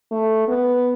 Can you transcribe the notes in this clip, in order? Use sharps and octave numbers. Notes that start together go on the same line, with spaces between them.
A3
B3